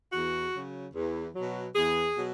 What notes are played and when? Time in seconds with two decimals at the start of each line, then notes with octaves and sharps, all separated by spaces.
0.13 E2 F#4
0.53 C#3 F#3
0.94 E2
1.35 B2 F#3
1.75 E2 G#4
2.16 B2 F#3